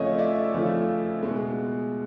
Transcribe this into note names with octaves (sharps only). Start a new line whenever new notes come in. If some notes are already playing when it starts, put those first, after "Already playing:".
Already playing: F2 C#3 F3 A3 C#5 D#5
D5 E5
F2 C#3 F3 A3
B2 G#3